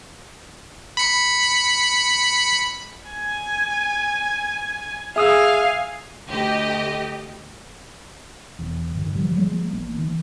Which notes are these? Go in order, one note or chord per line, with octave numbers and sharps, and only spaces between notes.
B5 C#7
G#5
G#4 E5 F5 G#5 D#6 E6
D2 G4 D#5
E1 E2
G2 D3 D#3
D3 E3 F3 G3
F3 G3 G#3 A#3
A1 A#3
D#3 E3